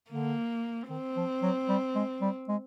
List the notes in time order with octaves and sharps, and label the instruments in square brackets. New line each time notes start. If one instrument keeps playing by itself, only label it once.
[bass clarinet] D3 [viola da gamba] A#3
[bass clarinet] D#3 [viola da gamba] C4
[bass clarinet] F3
F#3
G3
G#3
G3
G#3